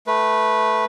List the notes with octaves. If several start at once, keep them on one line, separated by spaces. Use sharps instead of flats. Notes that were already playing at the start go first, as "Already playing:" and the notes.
A3 B4